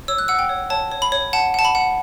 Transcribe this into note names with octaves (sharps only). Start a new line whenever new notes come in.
C#5 E6
F#6
F#5 E6
G5
C#5
C#5 A5
C#5
B5
C#5
F#5 A5
F#5 A5
B5
F#5